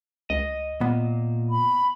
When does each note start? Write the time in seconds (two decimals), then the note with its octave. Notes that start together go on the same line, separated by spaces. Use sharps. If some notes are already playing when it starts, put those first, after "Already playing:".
0.30 C#2 D#5
0.81 A#2 B3
1.50 B5